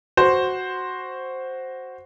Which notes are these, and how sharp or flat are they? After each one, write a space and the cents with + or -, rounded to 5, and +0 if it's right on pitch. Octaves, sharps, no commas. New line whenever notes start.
F#4 +0 C5 +0